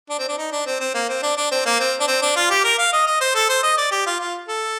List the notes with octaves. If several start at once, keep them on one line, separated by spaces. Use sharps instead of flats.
D4
C4
D4
D#4
D4
C4
C4
A#3
C4
D4
D4
C4
A#3
C4
D4
C4
D4
F4
G4
A#4
F5
D#5
D#5
C5
A4
C5
D#5
D5
G4
F4
F4
A4